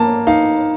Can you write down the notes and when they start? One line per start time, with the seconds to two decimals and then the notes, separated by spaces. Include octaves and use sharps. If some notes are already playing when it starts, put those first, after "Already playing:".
Already playing: A#3 A5
0.27 D#4 F5